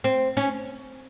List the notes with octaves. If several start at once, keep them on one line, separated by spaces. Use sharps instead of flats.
C4
C#4